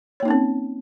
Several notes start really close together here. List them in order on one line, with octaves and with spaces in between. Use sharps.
C#5 A#3 D#4 C#4 C4